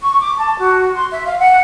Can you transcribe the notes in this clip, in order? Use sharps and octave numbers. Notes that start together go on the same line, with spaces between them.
C#6
D6
A5
F#4
C6
E5
F5
F#5